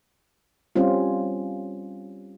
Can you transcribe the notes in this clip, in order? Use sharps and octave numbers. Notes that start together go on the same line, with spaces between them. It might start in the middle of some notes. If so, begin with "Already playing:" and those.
G3 C4 C#4 F4